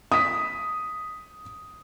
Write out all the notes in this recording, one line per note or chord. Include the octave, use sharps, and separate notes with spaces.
D#6 B6